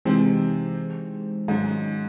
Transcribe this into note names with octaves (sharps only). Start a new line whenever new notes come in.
C3 E3 G#3 C4 D#4 G#4 C5
G#2 D#3 F#3 G#3 C#4